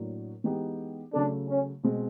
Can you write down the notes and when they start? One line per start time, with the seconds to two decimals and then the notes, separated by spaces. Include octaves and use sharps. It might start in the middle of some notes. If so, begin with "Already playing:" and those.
Already playing: A2 F#3 A#3 D4
0.44 E3 G#3 B3 D#4 G4
1.13 C#3 F#3 A3 D4
1.49 C#4
1.83 B2 G#3 C4